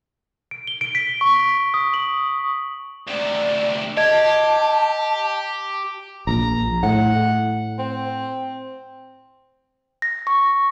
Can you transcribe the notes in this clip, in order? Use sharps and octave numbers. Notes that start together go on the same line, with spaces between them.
D7
G7
D7
B6
C#6
B6
D#6
F#7
D2 C3 D5
G4 D#5 A5 G#6
A#1 A#5
A2 F#5
C4
A#6
C#6